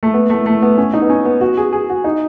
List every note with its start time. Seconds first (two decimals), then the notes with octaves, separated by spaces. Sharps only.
0.03 A3
0.14 B3
0.30 A3
0.46 A3
0.62 B3
0.77 C#4
0.94 D#4
1.02 B3
1.10 C#4
1.25 B3
1.41 F#4
1.57 G#4
1.73 G#4
1.90 F#4
2.04 D#4